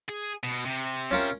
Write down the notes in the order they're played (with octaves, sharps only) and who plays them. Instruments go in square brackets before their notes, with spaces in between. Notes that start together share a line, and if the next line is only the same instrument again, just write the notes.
[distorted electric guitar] G#4
B2
C3
[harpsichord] C#4 F4 A#4